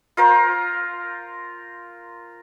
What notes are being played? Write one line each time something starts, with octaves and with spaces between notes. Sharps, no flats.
F4 A#4 C5